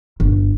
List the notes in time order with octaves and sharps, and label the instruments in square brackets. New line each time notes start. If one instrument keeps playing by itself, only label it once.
[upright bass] G1